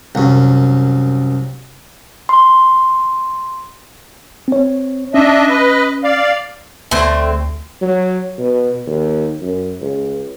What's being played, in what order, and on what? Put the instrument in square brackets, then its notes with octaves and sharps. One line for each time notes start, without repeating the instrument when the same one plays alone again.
[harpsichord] C2 F#2
[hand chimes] C6
[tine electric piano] C4 C#5
[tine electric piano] C#4 [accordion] D4 D#5 E5
[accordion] B4 D#5
D5 F5
[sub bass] D2 [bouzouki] D3 A3 C4
[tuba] F#3
B2
D#2
F#2
C#2